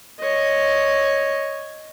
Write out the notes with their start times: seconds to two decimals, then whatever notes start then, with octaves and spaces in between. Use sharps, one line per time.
0.20 C#5 D#5